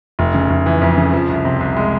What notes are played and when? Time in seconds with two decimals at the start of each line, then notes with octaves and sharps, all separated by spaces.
0.19 F1
0.34 C#3
0.50 F1
0.66 E3
0.81 F2
0.97 C#3
1.13 F3
1.29 C2
1.45 C3
1.60 C2
1.77 G#3